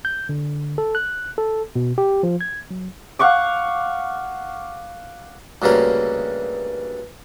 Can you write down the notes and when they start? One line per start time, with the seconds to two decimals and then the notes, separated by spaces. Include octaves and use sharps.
0.05 G6
0.29 D3
0.78 A4
0.95 F#6
1.38 A4
1.75 B2
1.98 G4
2.23 F3
2.41 G#6
2.71 F#3
3.19 F5 F#5 C#6 D6
5.62 D2 G2 C#3 A#3 F5